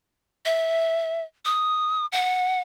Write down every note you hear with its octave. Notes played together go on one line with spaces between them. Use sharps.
E5
D#6
F#5